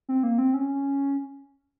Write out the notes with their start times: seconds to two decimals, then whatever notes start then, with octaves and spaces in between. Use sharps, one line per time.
0.09 C4
0.23 A#3
0.38 C4
0.54 C#4